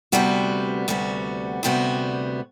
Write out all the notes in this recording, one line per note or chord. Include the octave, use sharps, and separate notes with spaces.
D2 C3 G3 B3 F#4
D2 C3 G3 B3 F#4
D2 C3 G3 B3 F#4